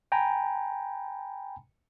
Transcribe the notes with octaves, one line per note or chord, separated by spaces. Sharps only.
G5 G#5 A#5 B5